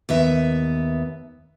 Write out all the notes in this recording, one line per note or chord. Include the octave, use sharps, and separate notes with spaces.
D#2 B3 E5